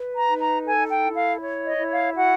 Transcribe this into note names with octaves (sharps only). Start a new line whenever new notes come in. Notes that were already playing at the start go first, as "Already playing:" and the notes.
Already playing: B4
A#5
D#4
A#5
A4 G#5
G5
E4
F5
C#5
D#5
E4
F5
F#4 F#5